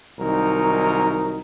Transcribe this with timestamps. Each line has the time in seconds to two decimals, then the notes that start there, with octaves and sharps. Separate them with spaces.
0.19 C2 D#3 F#3 D#4 A#4